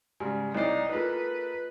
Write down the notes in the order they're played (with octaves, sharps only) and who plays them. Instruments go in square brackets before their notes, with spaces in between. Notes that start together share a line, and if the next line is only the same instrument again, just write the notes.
[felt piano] G#2 C#3 G3 [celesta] G#5
[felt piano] C2 D5 [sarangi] D#4 [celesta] E4 C#5 C7
[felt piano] A#3 G#4 A4 [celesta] F4 [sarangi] B4